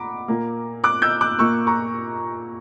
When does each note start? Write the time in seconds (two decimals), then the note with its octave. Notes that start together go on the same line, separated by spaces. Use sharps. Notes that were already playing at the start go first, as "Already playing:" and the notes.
Already playing: A#2 F#5 A#5 B5 D6
0.28 A#2 A#3
0.84 D6 F#6
1.02 E6 G6
1.21 D6 F#6
1.39 A#2 A#3 C#6 E6
1.67 A#5 C#6